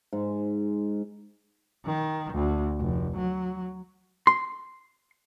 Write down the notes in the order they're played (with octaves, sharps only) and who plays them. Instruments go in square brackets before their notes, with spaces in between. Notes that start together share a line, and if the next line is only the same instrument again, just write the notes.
[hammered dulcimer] G#2
[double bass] D#3
D2
F1
F#3
[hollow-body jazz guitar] C6